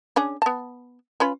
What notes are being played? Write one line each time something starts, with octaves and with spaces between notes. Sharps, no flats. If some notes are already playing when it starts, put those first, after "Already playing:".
C#4 D4 G#4
B3 A5
C#4 F4 B4